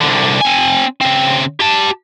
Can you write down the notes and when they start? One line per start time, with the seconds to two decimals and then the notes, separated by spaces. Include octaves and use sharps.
0.01 C2 D3
0.41 C4 G#5
1.01 C#3 C4
1.60 G4 A5